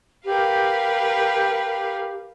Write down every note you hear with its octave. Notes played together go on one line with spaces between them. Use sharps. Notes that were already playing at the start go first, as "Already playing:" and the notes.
G4 A#4 B4 F5